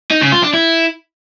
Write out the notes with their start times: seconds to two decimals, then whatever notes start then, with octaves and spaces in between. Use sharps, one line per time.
0.11 D#4
0.21 C#3
0.32 F4
0.43 D4
0.54 E4